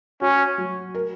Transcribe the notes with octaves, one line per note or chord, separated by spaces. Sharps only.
C#4 F#4
F#3
A#4